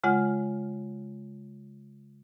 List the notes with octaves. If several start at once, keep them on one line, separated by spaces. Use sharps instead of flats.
C#3 G#3 F4 F#5 F6